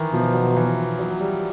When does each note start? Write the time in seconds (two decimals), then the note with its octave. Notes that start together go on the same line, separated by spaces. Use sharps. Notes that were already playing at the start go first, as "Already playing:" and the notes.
Already playing: D#3 E3
0.13 B2 F3
0.34 F#3
0.56 E3
0.99 F#3
1.20 G3